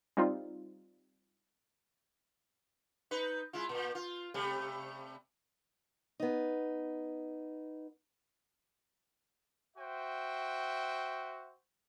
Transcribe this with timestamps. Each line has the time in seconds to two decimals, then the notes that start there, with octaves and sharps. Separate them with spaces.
0.17 G3 C4 D#4 F4
3.11 D#4 B4
3.53 G#3 E4 F4
3.69 A#2
3.95 F4
4.34 C3 G3 A3
6.20 B3 D#4
9.77 F#4 C5 E5 G5